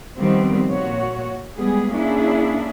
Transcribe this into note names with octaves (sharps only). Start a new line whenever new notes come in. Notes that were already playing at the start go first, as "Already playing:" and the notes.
D#3 F3 G3 B3 C4
A#2 F#4 C#5
G3 G#3 B3 G#4
A#3 C#4 D4 E4 G#4